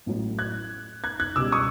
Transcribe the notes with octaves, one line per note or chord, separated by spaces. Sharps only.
A1 A2 F#3
F#6 G#6
F#6 G#6
F#6 G#6
C#2 B2 G3 D6 E6
C#6 D#6